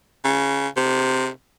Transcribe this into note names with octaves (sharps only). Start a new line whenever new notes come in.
C#3
C3